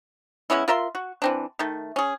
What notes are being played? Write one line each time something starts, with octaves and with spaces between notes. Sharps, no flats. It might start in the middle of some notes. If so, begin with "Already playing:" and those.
G#3 B3 C#4 E4
F4 A#4 E5 C6
F#4
E3 C4 D4
D#3 A3
C#4 G#4